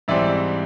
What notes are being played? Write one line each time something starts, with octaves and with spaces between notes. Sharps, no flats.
G#2 E3 G3 C4 D5 E5